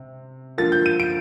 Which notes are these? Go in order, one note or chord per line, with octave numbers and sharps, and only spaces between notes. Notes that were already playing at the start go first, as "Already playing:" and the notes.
Already playing: C3
D3 F3 A#3 F4 A6
G6
D#7
D7